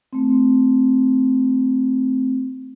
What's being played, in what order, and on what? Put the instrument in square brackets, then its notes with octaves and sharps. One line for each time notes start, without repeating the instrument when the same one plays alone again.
[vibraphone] A3 C4